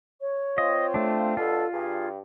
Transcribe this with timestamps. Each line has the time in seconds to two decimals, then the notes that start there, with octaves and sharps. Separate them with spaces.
0.21 C#5
0.58 C4 F4 D#5
0.94 A3 D4
1.37 B2 G3 D4 F4 A4
1.72 G2 G#4